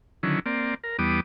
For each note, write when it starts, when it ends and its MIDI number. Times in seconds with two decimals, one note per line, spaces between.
0.23 0.39 50
0.23 0.39 51
0.23 0.39 54
0.23 0.39 61
0.23 0.39 64
0.46 0.74 58
0.46 0.74 60
0.46 0.74 74
0.84 0.97 70
0.99 1.20 40
0.99 1.20 55
0.99 1.20 59
0.99 1.20 86
0.99 1.20 87